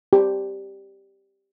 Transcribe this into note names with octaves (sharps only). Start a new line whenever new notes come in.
G4